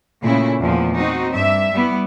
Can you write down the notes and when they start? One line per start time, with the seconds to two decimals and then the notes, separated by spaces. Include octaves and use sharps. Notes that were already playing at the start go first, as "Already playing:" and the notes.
0.24 A#2 C#3 A3 E4
0.60 E2 A#2 F3
0.97 C4 D#4 F#4
1.31 G2 E5
1.73 G3 B3 E4